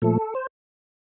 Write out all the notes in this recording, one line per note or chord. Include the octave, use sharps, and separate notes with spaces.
A#2 F3 A3 A4
C5